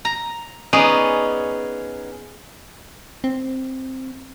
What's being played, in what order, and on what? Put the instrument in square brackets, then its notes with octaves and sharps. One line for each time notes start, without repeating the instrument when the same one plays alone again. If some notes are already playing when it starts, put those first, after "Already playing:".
[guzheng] A#5
B3 C#4 D#4 G#4 D5
[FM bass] C4